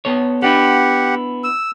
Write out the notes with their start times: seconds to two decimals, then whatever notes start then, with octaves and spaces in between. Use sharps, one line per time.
0.05 B3 A4 C#5
0.42 B3 D4 E4 G4 F#5
1.44 E6